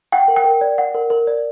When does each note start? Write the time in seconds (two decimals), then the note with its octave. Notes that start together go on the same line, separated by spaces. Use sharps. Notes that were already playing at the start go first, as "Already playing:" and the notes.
0.12 F#5 G5
0.28 A#4
0.36 G5
0.44 A#4
0.61 D5
0.78 F#5
0.95 A#4
1.10 A#4
1.27 D5